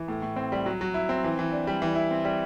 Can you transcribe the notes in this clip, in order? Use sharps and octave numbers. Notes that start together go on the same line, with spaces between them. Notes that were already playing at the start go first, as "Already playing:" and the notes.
Already playing: E3
A2
A2
C4
G3
F#3
F#3
E4
C4
E3
E3
D4
G3
E3
E4
C4
G3